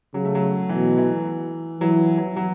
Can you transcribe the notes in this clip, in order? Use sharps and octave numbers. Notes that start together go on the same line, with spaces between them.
C#3 F#3
A3
F#3
B2 E3
E3
E3 F#3
F#3
F#3